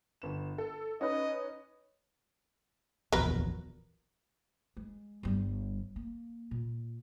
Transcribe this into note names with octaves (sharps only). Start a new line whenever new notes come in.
G1 E7
A4
C#4 D#4 B4 D#5
D1 A#1 E2 F#3 A#4 B4
G#3
G1 G3
A#3
A#2